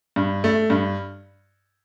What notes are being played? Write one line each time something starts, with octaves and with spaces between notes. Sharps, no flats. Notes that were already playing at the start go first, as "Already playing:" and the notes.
G2
A3
G2